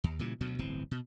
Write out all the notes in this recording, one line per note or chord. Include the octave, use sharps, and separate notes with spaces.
D#2
A#2 C#3 E3 G3
D2 B2 F#3
D1 G1 E3 C4
B2